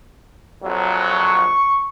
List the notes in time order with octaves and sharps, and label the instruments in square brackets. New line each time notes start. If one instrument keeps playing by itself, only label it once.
[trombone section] A#1 F2 F#3
[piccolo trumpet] C#6